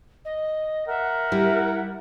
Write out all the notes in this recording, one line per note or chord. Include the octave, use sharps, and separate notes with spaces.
D#5
A#4 E5 F#5
G3 E4